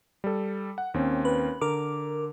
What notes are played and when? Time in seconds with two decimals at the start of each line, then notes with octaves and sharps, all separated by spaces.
0.24 G3 A4
0.78 F#5
0.94 D#2 C4 C#4
1.25 B4
1.61 D3 A#4 D6